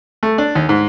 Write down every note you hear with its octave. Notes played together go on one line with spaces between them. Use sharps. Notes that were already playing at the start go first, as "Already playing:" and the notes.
A3
D4
D#2
G#2